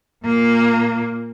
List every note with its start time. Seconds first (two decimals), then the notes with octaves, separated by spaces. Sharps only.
0.25 A#2 A#3